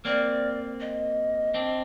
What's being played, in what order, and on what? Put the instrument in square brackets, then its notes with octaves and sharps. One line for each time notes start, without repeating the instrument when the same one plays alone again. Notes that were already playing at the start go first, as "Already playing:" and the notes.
[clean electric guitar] A#3 C4 [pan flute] D5
[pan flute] D#5
[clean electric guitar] C4 D4